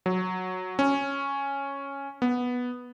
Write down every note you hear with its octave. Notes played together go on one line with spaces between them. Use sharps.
F#3
C#4
B3